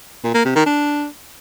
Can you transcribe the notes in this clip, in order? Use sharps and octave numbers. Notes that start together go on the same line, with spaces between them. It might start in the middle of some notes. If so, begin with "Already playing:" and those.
A#2
A#3
C3
D#3
D4